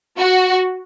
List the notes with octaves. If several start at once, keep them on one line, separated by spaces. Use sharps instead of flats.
F#4